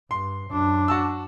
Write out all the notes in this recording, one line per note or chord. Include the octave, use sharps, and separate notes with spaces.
G2 C6
F#2 D4
F#4 A5 E6